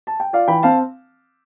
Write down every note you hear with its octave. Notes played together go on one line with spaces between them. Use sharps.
A5
G5
F4 D5 F5
E3 G5 B5
C4 F5 A5